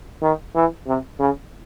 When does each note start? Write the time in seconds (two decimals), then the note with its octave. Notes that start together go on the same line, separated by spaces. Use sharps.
0.22 D#3
0.55 E3
0.87 C3
1.19 C#3